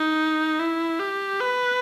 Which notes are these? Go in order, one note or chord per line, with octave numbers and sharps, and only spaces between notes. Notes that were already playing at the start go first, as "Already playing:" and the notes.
Already playing: D#4
E4
G4
B4